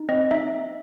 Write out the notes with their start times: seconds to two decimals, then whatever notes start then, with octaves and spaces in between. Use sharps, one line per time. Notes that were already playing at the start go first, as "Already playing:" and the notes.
Already playing: D#4
0.09 C4 D#5
0.31 D#4 E5